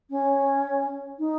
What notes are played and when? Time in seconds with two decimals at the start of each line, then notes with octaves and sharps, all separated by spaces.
0.10 C#4
1.19 D#4